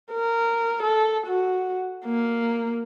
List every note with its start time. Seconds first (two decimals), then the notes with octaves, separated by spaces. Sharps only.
0.12 A#4
0.83 A4
1.27 F#4
2.05 A#3